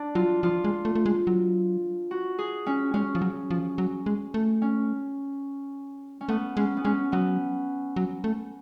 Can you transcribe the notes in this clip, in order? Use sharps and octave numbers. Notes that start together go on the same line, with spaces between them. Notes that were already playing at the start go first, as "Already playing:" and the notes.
Already playing: D4
F#3 F4
F3 F4
G#3
A3
A3
G#3
F#3
F#4
G#4
C#4
G#3 C#4
F3
F#3
F3
F#3
G#3
A3
C#4
C#4
A3 B3
G#3 C#4
B3
G#3 C#4
F#3 B3
F#3
A3